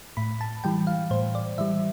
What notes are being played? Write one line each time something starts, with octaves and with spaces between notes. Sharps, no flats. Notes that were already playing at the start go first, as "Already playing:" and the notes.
A2 B5
A5
E3 G3 G5
F5
A2 C5
D5
E3 G3 E5